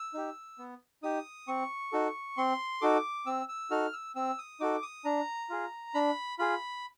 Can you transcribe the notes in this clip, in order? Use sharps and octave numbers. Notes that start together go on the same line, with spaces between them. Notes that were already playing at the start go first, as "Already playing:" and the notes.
Already playing: E6
D#4 G4
B3
D#4 G4 D#6
C4 C#6
D#4 F#4 A4
C4 C6
D#4 F#4 A4 D6
C4 E6
E6
D#4 F#4 A4 F6
E6
C4 E6
D#6
D#4 F#4 A4 D6
D#6
D4 A#5
F4 G#4
D4 B5
F4 G#4 B5